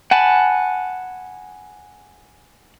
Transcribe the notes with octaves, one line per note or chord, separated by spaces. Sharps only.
F#5 G#5 A5 B5